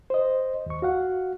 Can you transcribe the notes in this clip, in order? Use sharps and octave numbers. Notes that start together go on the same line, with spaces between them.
C5 D#5
D#2 C#6
F#4 F5 F#5